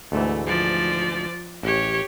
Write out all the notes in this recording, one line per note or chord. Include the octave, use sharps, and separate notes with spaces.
D2 G#2 E3 A3
F3 D5
A1 G4 C#5